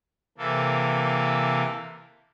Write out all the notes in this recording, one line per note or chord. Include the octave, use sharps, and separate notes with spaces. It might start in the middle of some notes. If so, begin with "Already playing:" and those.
C3 E3 A#3 A4